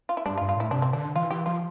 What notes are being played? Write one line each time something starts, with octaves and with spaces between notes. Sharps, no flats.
F4
E4
G2 D4
F4
G2
F4
A2 E4
C3 D4
C4
D3 D4
E3 F4
E3 G4
F3 F4